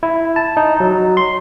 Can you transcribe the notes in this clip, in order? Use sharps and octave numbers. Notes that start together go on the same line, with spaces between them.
E4
A5
D#4
F#3
C6